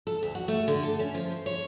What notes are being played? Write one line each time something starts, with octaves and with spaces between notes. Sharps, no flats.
A4
D2
F#4
A3
D3
A4
C#4
F3
C5
C#5